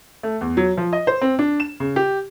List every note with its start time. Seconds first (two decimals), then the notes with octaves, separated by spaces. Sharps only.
0.23 A3
0.41 E2
0.57 F#3
0.77 F3
0.93 D#5
1.07 C5
1.21 C4
1.39 D4
1.60 E7
1.80 C#3
1.96 G4